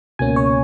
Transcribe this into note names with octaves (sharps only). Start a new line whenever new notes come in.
C#2 B2 A#3 C#4 G#5
C#5